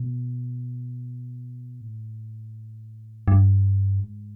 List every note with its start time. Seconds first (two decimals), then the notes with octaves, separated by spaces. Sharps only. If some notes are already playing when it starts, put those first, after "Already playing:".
Already playing: B2
1.81 A2
3.28 G2
4.00 G#2